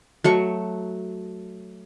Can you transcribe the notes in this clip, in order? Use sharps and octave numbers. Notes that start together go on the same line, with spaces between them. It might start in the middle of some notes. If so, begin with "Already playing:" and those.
F#3 A3 C#6